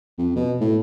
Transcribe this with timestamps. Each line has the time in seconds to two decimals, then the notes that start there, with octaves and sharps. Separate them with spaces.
0.19 F2
0.36 B2
0.61 A2